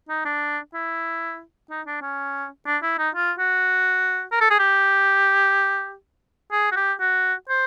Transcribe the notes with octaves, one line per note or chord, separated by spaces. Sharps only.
D#4
D4
E4
D#4
D4
C#4
D4
E4
D#4
F4
F#4
A#4
A4
G#4
G4
G#4
F#4
G4
F#4
C5